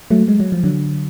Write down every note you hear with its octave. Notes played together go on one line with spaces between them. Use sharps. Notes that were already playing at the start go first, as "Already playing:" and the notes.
F#3 A3
G#3
F#3
F3
D3 F#3